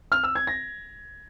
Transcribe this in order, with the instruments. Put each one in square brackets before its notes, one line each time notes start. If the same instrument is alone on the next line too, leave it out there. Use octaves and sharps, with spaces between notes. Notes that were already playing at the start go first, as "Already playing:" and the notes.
[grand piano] F6
E6
G#6
A#6